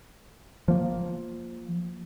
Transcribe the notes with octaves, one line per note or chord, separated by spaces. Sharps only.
F3 A#3